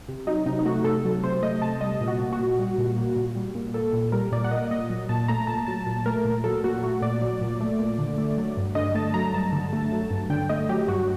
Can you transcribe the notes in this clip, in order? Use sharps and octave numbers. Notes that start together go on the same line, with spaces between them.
C3
F#3 D#4
C3 D#4
D#4
A3 F#4
C3 A4
F#3
C3 C5
A3 D#5
C3 A5
G3 D#5
A#2
F#4
A#3
F#4
A#2
G3
A#2
A#3
A#2
G3
A#2
A#3 A4
A#2
G3 A#4
A#2 D5
F#5
A#3 D#5
A#2 D#5
F#3
A#2 A5
A3 A#5
A#2 A5
F#3 A5
A#2
A3 A#4
A#2
F#3 A4
A#2 F#4
A3 F#4
A#2 D5
F#3
A#2
A3
A#2
D3
A3
F#3
G2
D3 D#5
A3 A5
F#3 A#5
G2 A5
D3
A3
F#3
G2
D3 G5
A3 D#5
F#3 G4
G2 F#4